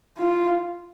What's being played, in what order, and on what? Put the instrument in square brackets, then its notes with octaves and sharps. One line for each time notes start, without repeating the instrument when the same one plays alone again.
[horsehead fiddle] F4